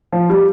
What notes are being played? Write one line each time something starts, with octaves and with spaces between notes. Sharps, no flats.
F3
G3